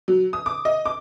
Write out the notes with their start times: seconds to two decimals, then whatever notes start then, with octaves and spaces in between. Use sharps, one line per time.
0.08 F#3
0.33 D#6
0.46 D6
0.65 D#5
0.86 D6